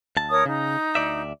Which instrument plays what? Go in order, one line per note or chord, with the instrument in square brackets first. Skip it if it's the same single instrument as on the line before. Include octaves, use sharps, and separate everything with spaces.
[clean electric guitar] D2 A5
[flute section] A#4 C#5 D#6
[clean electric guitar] C#3 [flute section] D#4
[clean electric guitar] D2 D5 E5